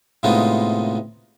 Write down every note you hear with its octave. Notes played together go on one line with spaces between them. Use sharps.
A2 C3 G#3 B3 D#4 F4